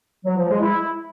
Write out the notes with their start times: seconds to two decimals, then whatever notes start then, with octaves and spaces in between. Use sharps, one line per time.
0.25 F#3
0.37 F3
0.49 G#3
0.61 E4